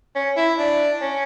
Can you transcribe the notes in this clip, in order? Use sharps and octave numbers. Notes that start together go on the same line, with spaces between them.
C#4
E4
D4
C#4